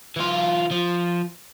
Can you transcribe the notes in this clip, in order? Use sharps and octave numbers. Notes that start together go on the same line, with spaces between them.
E3 F4
F3